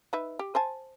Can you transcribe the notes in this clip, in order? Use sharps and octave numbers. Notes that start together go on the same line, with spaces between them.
D#4 B4 E5
G4
C5 G#5 A5